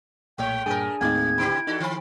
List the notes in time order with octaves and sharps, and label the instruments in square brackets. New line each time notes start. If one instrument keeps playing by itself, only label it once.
[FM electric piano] B1 A#2 [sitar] G#3 C#5 [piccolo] G5
[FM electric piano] G2 A#2 [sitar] A3 A#4 [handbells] D4 G#4 G#5
[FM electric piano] D#2 A2 D#4 [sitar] A3 [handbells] A#3 C4 G#4 [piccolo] G#6
[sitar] C#3 B3 G4 [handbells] E4 D7
[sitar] E2 F#4 A4 [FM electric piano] D#4
[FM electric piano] D#3 B5 [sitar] E3 C4